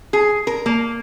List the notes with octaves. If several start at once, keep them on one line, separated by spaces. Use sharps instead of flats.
G#4
A#4
A#3